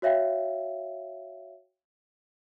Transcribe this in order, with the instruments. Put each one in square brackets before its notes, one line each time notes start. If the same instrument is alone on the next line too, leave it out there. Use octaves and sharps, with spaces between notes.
[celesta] F#4 C#5 E5 F5 G5